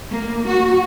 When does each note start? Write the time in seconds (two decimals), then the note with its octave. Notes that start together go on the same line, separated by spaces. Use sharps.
0.11 A#3
0.47 F#4